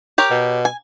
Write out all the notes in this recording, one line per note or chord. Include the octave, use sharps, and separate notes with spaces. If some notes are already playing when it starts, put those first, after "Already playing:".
G4 A#4 C#5
B2
G#5